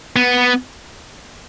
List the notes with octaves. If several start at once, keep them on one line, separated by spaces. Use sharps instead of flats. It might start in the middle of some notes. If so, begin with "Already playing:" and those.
B3